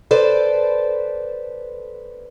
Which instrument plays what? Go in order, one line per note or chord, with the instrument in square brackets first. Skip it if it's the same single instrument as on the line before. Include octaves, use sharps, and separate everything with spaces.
[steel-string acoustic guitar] A4 B4 C5 D5